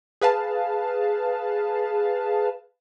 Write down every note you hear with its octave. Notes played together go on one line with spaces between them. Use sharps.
G#4 B4 F5 A5